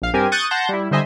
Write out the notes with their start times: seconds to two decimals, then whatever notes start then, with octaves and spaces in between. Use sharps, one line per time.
0.02 A#1 F5
0.13 G2 C4 G4 A#4 G#5
0.32 C#6 D#6 F#6 G6 A6
0.51 F#5 A5 C6 G6 A#6
0.69 G3 E4
0.91 D3 G3 C5 D#5 E5 G#5